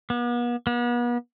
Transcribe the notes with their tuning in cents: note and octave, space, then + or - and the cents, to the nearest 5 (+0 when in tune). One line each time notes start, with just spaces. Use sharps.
B3 -40
B3 -40